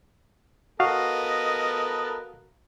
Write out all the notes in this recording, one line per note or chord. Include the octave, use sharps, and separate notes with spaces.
B3 F#4 A4 A#4 D#5 F5